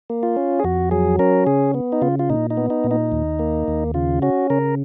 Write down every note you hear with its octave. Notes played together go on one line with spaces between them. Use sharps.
A#3
F4
C#4
G#4
F2 F#4
F#3 G#4
C#4 A#4
C#3 G#4
B3
D#4
C#3 F4
F4
A#2 D#4
D#4
B3
D#4
A#2
D#4
D#2
A#3
D#2
C#3 F4
C#4 F#4
C#3 A#4